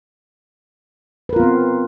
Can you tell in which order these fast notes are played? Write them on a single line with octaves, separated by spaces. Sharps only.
B4 A#4 F4 B3 C4